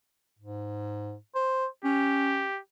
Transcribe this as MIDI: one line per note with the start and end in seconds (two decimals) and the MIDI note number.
0.39 1.15 44
1.35 1.66 72
1.85 2.47 61
1.85 2.60 67